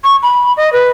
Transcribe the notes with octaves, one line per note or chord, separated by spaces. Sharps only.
C#6
B5
D#5
B4